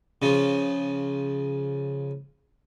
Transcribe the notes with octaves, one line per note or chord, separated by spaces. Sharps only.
C#3 F3